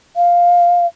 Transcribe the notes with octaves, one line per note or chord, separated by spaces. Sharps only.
F5